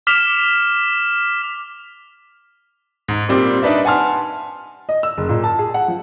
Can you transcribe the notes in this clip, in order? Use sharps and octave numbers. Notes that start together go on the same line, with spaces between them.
D6 F6 B6 E7 F7
G#2
A#2 G3 C4 D6
D4 D#4 B4 D5 E5
F#5 G#5 A5 C6 F6
D#5
E6
F#1
A#2
A5
G#4
F#5
F3